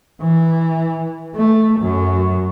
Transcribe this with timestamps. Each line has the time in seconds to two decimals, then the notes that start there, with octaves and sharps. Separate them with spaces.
0.21 E3
1.35 A3
1.80 F#2